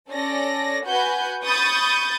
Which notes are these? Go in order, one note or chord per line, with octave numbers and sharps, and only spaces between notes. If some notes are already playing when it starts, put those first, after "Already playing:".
C#4 A4 D5 A#6
F#4 B4 F#5 G#5 G6
B5 C#6 D#6 G6 A6